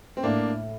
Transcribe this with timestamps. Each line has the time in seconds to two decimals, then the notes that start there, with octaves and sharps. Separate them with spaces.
0.17 C4
0.23 A2 A#3 D4